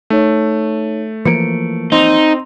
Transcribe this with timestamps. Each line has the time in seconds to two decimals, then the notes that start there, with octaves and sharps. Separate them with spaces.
0.10 A3 D#4 C#5
1.25 E3 F3 A#3 C#7 D7
1.92 C4 D#4 C6 F7